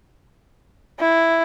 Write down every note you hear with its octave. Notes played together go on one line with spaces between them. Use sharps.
E4